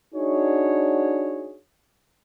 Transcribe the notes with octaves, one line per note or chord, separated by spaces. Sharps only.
D4 D#4 F#4 G#4 C#5